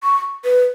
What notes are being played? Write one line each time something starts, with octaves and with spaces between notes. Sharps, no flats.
C#6
B4